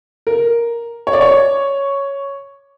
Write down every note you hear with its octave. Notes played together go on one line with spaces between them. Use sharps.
A#4
C#5
D5
C#5